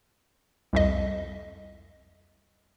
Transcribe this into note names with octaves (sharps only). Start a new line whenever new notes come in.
C2 F2 D#5